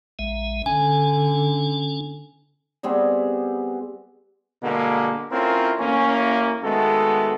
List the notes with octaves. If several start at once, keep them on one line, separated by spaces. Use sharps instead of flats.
A#1 G#3 E5
D3 C#4 D4 G#5
G3 B3 C4 G#4
G2 B2 D3 G#3 A#3
A3 C4 C#4 E4 F4 A#4
A1 A#3 C#4
D#3 G#3 A3 B3 F#4 A4